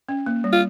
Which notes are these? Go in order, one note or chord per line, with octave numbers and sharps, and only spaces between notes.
C#4
A#3
G3
F4